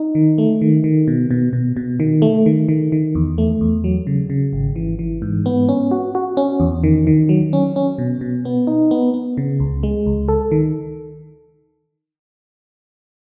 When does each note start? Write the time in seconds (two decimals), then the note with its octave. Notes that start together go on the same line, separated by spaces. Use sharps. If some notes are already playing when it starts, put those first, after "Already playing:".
Already playing: D#4
0.15 D#3
0.38 A3
0.61 D#3
0.84 D#3
1.08 B2
1.31 B2
1.53 B2
1.77 B2
2.00 D#3
2.22 A3
2.46 D#3
2.69 D#3
2.92 D#3
3.15 E2
3.38 A3
3.61 E2
3.84 F#3
4.07 C#3
4.30 C#3
4.53 G#1
4.76 E3
4.99 E3
5.22 G#2
5.46 B3
5.69 C#4
5.91 F#4
6.15 F#4
6.37 C#4
6.60 E2
6.84 D#3
7.07 D#3
7.29 F#3
7.53 C#4
7.76 C#4
7.98 B2
8.21 B2
8.45 B3
8.67 D#4
8.91 B3
9.14 B3
9.37 C#3
9.60 C#2
9.83 G#3
10.06 C#2
10.28 A4
10.51 D#3